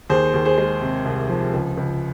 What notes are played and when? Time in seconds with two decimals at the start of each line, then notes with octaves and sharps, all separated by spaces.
0.10 D#2 G#4 C5
0.34 D#2
0.45 G#4 C5
0.58 G#3
0.81 C3
1.05 C2
1.29 F3
1.53 C#2
1.77 C#2